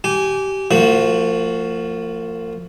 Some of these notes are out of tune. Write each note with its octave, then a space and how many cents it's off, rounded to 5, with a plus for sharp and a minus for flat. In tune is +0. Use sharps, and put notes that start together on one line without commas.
G4 -20 G#5 +0
F3 +0 A#3 -40 F#4 +0